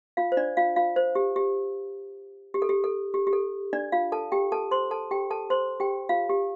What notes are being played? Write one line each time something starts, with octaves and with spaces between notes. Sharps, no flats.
F4 F5
C5
D4 D5
F4 F5
F4 F5
C5
G4
G4
G4
A4
G4
A4
G4
G4
A4
D4 D5
F4 F5
A4 A5
G4 G5
A4 A5
C5 C6
A4 A5
G4 G5
A4 A5
C5 C6
G4 G5
F4 F5
G4